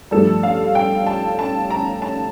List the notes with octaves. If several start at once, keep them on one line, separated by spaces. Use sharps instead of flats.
G2 F3 A3 D4 A4
F5
G5
A5
A5
A#5
A5